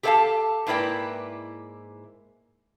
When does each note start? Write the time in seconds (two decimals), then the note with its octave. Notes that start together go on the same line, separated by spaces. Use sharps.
0.03 G4 A4 C5 E5 F5 A5
0.67 G#2 A#3 E4 B4 D5 G5